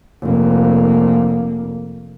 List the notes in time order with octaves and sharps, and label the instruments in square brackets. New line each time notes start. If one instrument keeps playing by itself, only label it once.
[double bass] F1 A#3